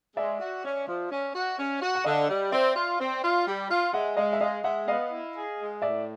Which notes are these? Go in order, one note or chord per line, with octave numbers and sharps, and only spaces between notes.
G#3 D5 E5
F#4
C#4
F3
C#4
F#4
C#4
F#4
F#5
D3 D#5 F5
G3
C4 D5 E5
F4
C4
F4
G3
F4
G#3 E5 F#5
G#3 D#5 F5
E5
G#3 D#5 F5
G#3 E5 F#5
B3 D#5 F5
E4
G#4
G#3
A2 D5 E5